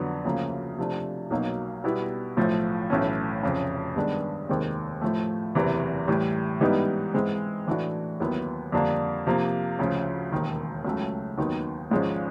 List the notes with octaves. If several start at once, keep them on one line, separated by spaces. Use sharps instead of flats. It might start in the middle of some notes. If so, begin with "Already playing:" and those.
Already playing: F2 D3 F#3 B3
D2 C#3 F3 A#3
C3 F3 A3 D4
B1 B2 F#3 A#3 D#4
B2 G3 B3 E4
B1 A2 F3 A3
B1 A2 E3 A3 C#4
F1 F2 C#3
G2 D#3 G#3 B3 D4
F1 D#2 D#3 G#3 C4
A2 F3 A3
F#1 E2 C3 E3
A2 E3 G3
G#2 E3 G3 B3 D#4
G#2 E3 G#3 C4
A2 E3 A3 D4 F#4
D#2 D#3 F#3 B3 E4
F2 D3 G3 A#3 D4
C3 F3 A#3
D2 C#3 F3
E1 D#2 D#3
C#2 C#3 F#3 A3
D#2 D#3 F#3 B3 D#4
G#1 G#2 F3 G#3 C#4